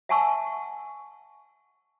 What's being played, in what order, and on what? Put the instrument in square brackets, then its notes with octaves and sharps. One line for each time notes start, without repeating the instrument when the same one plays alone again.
[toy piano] E5 F#5 G#5 A5 C#6 E6